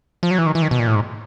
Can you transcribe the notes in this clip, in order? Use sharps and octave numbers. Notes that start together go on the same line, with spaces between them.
F3
F#3
E3
D#3
E3
D#3
B2
A#2
A2
G#2